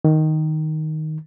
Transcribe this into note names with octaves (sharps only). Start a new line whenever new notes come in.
D#3